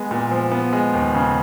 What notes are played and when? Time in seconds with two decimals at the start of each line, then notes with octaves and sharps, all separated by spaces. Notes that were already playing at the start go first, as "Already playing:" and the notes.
Already playing: G#3 B3
0.11 A#2
0.31 F3
0.52 B3
0.73 G#3
0.94 D#2
1.14 C#3